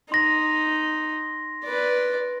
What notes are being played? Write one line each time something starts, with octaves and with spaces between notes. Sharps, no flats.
D#4 C6 A#6
B4 D5